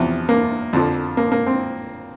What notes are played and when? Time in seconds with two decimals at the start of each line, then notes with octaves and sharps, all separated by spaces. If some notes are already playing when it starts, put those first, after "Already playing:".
Already playing: E2 C3 F3
0.29 A#3
0.73 F2 D3 F3
1.17 A#3
1.32 A#3
1.47 C4